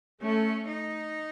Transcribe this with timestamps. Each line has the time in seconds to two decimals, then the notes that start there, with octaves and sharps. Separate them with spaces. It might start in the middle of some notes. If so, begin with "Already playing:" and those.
0.22 A3 C#4
0.69 D#4